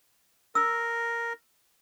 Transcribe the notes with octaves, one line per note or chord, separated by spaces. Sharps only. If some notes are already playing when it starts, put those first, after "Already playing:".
A#4 E6